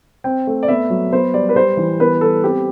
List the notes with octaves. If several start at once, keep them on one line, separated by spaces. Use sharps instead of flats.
C4 G5
A3
D5
B3 E5
F#3
B3 C5
G3 D5
B4
G3 C5
E3
B3 B4
G3 A4
C4 G4